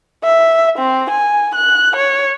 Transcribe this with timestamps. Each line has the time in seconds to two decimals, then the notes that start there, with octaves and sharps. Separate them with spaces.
0.24 E5
0.79 C4
1.10 G#5
1.55 F#6
1.96 C#5